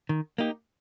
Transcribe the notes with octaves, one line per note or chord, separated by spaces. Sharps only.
D#3
A#3 D#4 G4